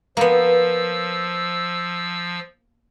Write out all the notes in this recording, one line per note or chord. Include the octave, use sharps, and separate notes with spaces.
F3 A#3 B3 E6